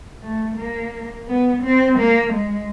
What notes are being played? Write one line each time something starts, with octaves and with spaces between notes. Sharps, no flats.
A3
A#3
B3
C4
A#3
G#3